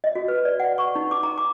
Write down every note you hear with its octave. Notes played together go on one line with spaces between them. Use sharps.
D#5
F#4
B4
D5
F#5
C#6
D#4
D6
A#5
D6